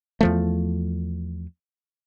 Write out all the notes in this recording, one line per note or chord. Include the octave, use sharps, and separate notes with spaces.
E2 F3 A3